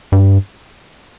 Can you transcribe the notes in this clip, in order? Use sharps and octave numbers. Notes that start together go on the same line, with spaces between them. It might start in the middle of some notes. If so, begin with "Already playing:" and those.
G2